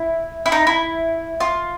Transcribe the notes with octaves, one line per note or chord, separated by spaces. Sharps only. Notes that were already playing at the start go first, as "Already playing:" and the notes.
Already playing: E4
E4
D#4
E4
F4